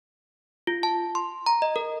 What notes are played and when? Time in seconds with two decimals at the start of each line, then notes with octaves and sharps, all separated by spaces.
0.67 F4
0.83 A5
1.15 C6
1.46 A#5
1.62 D#5
1.76 A#4